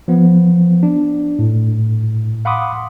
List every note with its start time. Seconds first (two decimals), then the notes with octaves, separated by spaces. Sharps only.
0.08 F3 B3
0.83 D4
1.39 A2
2.45 F5 F#5 B5 C6 D6 D#6